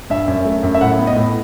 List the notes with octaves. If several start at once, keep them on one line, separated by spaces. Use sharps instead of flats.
G2 E5
F#2
A3
F#2
E5
A2 F#5
B3
D#5
A2